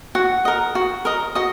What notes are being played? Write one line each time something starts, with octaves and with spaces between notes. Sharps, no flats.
F#4 F#5
A#4 D#5
F#4
A#4 D#5
F#4 D#5